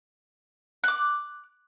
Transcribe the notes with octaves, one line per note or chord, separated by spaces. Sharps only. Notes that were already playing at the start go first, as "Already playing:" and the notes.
D6 F#6